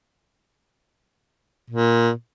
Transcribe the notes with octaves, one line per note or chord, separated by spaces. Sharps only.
A#2